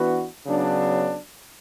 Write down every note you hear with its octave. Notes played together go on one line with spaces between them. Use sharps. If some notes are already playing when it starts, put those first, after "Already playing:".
Already playing: E3 B3 D4 F#4 B4
C#3 F#3 B3 D4